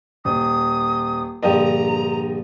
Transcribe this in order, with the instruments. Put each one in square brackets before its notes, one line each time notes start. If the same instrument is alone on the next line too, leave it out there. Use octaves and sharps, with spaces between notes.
[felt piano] D#1 [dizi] D#6
[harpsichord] A#1 G2 D3 [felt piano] D#5 G5 [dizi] A#5